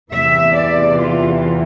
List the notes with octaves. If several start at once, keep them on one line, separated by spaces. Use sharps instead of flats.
E2 C3 E3 E5
D5
F4